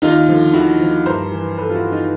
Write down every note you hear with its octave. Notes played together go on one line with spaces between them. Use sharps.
D#2 D#4 F4
D3 F3
D#2 E4 F#4
D3 F3
G2 A#4 C5
E3
G2 A4 B4
F4
E4 F#4
E3
D#4 F4